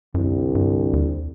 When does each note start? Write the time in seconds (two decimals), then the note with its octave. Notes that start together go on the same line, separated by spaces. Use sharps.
0.14 C2 F#2 D3
0.55 G2
0.93 D#2